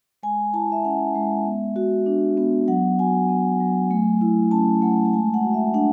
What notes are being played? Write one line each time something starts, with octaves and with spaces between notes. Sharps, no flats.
G#3 G#5
E4 A5
E5
C#4 F#5
G#3 E5
B3
F#4
D4
B3
F#3 F#5
F#4 G#5
B3
F#3
A3
E4
C#4 A5
A3 F#5
A5
G#3 G#5
F#5
F#4
E5
D4 F#5